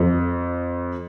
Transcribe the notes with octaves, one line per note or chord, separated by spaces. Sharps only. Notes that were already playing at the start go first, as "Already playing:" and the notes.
Already playing: F2